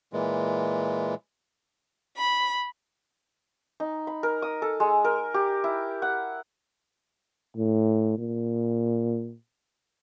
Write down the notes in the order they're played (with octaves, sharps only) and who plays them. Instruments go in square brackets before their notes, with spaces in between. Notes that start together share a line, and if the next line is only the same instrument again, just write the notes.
[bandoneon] A#2 E3 G#3
[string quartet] B5
[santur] D#4
B5
A#4
D#6
A4
G#3
A#4
G4
E4
F#5
[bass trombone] A2
A#2